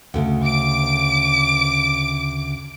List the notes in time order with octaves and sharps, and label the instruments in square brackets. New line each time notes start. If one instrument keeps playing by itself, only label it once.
[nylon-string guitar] D2 C#3
[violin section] D6 D7